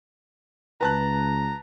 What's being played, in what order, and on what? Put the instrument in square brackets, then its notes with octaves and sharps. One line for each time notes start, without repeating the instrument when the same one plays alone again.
[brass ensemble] C#2 [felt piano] B4 A5 F#6 [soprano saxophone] A#5